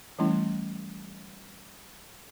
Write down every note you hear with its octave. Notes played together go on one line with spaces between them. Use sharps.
E3 G3 A3 C#4 E4